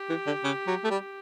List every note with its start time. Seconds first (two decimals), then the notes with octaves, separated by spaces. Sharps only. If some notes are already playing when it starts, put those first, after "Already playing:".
Already playing: G4
0.10 E3
0.27 D3
0.44 C#3
0.67 F#3
0.84 A3
0.91 G3